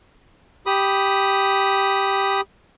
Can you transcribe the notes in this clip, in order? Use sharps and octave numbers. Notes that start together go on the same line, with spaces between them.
G4 B5 D#6